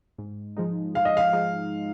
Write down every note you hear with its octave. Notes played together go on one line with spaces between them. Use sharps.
G#2
F3 G#3 D#4
G#2 F5
D#5
F5
F3 G#3 D#4